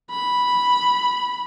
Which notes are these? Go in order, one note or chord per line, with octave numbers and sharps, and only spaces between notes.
B5